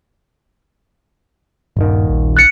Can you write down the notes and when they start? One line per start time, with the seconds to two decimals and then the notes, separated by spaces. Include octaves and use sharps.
1.77 D#1 G2 D#3
2.10 A#1
2.37 F#6 A6 C#7